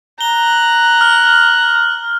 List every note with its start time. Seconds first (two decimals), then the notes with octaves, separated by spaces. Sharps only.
0.21 A#5 F#6 G7
1.01 F6